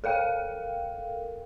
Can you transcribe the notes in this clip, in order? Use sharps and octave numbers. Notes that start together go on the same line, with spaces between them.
A4 A#4 F5 G5